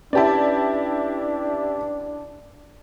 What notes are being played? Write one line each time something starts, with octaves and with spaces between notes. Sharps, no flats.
C#4 D4 E4 G4 B4 D5 A5